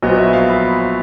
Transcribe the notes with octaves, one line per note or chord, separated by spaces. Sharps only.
A#1 A#2 F#3 B3 D#5
E5
F5
B5